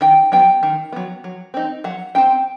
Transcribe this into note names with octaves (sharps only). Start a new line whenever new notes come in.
D#3 G5
F#3 B3 G5
D#3
F#3 B3
F#3
C4 D#4
F#3 F#5
C4 D#4 G5